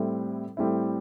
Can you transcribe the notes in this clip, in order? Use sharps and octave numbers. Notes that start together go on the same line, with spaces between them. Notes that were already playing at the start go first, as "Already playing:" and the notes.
Already playing: A2 G3 C4 E4
A2 G3 C4 E4